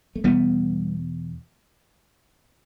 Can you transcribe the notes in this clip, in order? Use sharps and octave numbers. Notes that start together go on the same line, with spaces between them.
A3
E2 B2 G3 B3